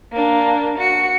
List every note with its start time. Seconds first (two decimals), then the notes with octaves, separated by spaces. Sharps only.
0.12 A#3 D4
0.78 F#4 C#7